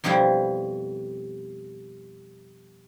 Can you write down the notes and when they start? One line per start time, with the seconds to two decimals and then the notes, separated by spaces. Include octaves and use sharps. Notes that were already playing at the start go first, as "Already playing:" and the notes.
0.04 F2 B2 F3 G3 E4